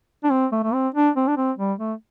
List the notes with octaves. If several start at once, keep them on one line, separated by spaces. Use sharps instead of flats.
D4
C4
A3
A3
C4
D4
C4
D4
C4
G3
A3